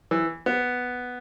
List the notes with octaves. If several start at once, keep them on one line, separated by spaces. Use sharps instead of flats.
E3
B3